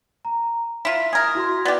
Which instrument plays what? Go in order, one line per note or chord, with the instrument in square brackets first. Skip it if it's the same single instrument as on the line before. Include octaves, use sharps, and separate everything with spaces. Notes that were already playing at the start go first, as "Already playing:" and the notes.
[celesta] A#5
[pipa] E4 F4 [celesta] B6
[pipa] G#4 A#4 [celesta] D#6 G#6
[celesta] E4 F#4 C6
[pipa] B3 G4 [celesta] D5